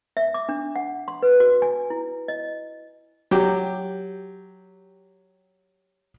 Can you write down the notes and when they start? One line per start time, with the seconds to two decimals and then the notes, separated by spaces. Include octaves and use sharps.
0.17 E5
0.34 D6
0.49 D4
0.76 F#5
1.08 C6
1.23 B4
1.40 F#4
1.62 G#5
1.90 E4
2.28 D#5
3.31 F#3 G4